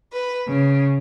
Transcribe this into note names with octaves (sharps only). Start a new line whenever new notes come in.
B4
C#3